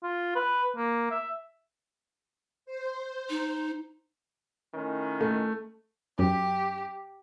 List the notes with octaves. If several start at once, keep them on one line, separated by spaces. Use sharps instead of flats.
F4
B4
A#3
E5
C5
D#4
A2 D#3 C#4
A3
F#2 G4